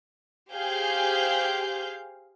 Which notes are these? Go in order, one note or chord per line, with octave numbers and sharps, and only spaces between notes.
G4 G#4 C5 F5 G6